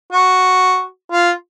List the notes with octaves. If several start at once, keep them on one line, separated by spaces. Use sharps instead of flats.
F#4
F4